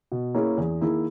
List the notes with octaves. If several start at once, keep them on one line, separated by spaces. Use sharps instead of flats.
B2
A#3 C#4 E4 G#4
E2
D#3 A#3 E4 G#4